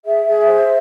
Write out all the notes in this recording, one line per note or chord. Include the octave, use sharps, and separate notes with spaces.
G#4 E5
G#4
C5